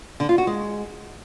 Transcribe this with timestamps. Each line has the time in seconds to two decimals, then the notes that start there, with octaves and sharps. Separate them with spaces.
0.20 D3
0.29 F4
0.38 F#4
0.47 G#3